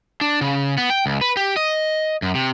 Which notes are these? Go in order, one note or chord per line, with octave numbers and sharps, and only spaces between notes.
D4
C#3
B3
G5
C#2
B4
G4
D#5
F#2
C3